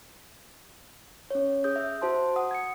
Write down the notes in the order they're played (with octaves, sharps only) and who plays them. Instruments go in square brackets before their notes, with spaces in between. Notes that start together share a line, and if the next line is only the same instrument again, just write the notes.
[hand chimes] C#4 C#5
G#4 D#6 G6
E5
F#4 C5 A5 C6
F#5 D#6
G#6 C#7